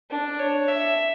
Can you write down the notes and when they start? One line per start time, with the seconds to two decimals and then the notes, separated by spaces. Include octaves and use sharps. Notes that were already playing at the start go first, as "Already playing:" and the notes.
0.10 D4
0.40 C#5
0.68 E5